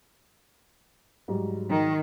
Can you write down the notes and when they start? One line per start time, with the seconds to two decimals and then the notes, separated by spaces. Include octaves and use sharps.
1.28 G#2 F#3 G3
1.70 D#3